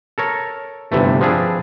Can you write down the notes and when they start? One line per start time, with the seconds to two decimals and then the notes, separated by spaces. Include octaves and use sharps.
0.18 A4 A#4 C#5
0.92 G1 C3 E3 A3
1.21 F3 C4 D4 G#4 B4